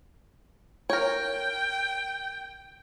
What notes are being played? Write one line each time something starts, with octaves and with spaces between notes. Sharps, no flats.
A#4 C#5 G5